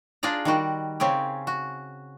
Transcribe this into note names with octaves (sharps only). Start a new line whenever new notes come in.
D4 F4 G#4 D5 A#5
D#3 G3 F#4
C#3 C4 C#4 G4
F#4